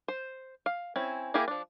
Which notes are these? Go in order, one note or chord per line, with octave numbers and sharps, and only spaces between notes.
C5
F5
C4 C#4 E4
A#3 E4 G4 G#4 A#4
F3 D4